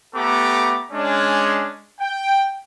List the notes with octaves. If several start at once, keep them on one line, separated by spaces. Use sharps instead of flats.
A3 B3 G4 A4 A#5 D6
G#3 C#4 D4
G5